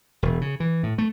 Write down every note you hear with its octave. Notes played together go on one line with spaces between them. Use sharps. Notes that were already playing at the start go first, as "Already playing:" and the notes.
E1
C#3
E3
A2
A3